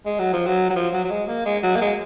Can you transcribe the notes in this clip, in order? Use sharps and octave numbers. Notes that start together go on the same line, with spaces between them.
G#3
F#3
F3
F#3
F#3
F3
F#3
F#3
G#3
A#3
G#3
F#3
A#3
G#3